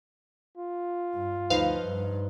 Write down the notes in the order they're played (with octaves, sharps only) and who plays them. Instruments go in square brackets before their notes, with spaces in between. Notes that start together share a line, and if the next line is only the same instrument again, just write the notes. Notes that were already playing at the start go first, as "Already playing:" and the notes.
[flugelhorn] F4
[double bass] G2
[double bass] D2 F3 [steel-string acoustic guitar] D#4 B4 C5 [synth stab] F5
[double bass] G2